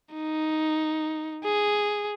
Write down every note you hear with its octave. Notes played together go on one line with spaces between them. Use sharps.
D#4
G#4